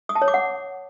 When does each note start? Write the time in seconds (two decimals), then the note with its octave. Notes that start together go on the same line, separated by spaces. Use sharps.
0.09 D#6
0.15 A5
0.22 C#5
0.28 D6
0.34 F#5